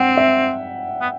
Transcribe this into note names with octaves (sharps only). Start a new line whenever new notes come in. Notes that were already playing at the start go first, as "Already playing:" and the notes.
Already playing: C4 F#5 G5
E5
B3